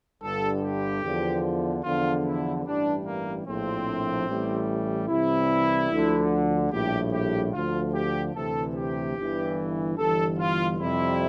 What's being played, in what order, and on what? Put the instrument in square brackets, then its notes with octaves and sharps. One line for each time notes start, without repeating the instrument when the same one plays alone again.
[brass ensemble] G1 G2 D3 A4
G4
E2 D3 F3
E2 D3 F3 F4
E4
A1 G2 E3 G3 D4
A#3
A#1 A2 F3 C4
A1 A2 E3 G3
C2 C3 E3 G3 E4
D2 D3 F3
A#1 A2 G3 G4
G4
D2 D3 F3 F4
G4
D2 C3 E3 A4
G4
G1 G2 E3
G1 G2 E3 A4
F4
F2 C3 G3 E4